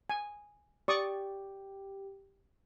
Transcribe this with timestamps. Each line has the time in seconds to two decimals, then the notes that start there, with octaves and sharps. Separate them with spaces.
0.10 G#5
0.88 G4 D5 G5 C#6 D#6